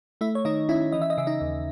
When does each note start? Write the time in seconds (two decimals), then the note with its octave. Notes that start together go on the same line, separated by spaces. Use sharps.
0.21 A3 E4 E5
0.35 C#5
0.45 D#3 D#4 D#5
0.69 C#4 E4 E5
0.92 E3 D#5
1.02 E5
1.10 D#5
1.18 C#3 E5
1.27 D#4 D#5
1.41 D#2